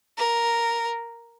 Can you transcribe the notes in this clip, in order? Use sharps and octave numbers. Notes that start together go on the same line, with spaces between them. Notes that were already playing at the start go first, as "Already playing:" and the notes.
A#4